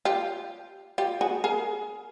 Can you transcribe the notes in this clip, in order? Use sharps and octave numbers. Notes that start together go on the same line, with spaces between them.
F4 G4
F4 G4
F#4 G#4
G#4 A#4